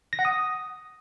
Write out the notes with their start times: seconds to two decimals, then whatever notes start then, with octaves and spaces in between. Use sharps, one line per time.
0.13 A#6
0.19 F#5
0.25 D#6